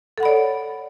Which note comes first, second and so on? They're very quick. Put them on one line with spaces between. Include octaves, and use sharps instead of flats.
A4 F#5 B5 D5 C#5